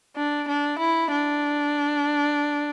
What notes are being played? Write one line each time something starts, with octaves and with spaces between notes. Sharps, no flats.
D4
D4
E4
D4